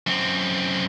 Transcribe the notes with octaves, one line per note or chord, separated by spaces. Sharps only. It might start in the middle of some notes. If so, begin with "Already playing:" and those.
F#2 C4